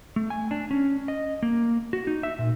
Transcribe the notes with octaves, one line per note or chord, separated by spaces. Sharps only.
A3
G#5
D4
C#4
D#5
A#3
F#4
D#4
E5
A#2